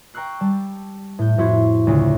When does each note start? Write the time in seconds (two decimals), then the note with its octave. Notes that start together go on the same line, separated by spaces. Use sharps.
0.14 G5 A#5 C#6 E6 F#6 C7
0.40 G3 A5
1.19 A2 G6
1.38 F2 A2 E4 F#4 C6 G#6
1.87 D2 C#3 F4